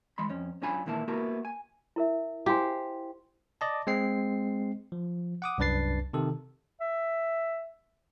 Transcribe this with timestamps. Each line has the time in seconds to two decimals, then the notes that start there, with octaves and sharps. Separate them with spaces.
0.18 E3 G#3 B5 C6
0.29 F2 C#4
0.62 F#2 C#4 D4 F4 G#5 B5
0.86 D#2 A#2 E3 A#3 E4 A5
1.08 A#3 B3 E4 F#4 G4 A#4
1.45 G#5
1.96 E4 A#4 E5
2.46 E4 G4 C5 F5 G#5
3.61 D5 D#5 A5
3.87 G#3 C4 C7
4.92 F3
5.42 F#5 D6 D#6
5.58 C2 F#2 D4 B4 A6 C7
6.13 C3 D#3 A4
6.81 E5